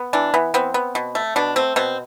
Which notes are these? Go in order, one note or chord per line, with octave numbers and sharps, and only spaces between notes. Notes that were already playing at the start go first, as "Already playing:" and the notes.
Already playing: B3
E3 D4
E3 B3
B3 C4
B3
B2
A3
B2 D4
A3 C4
B2 C4